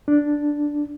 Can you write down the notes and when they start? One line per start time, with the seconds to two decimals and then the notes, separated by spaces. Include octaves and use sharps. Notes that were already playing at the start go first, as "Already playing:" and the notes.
0.08 D4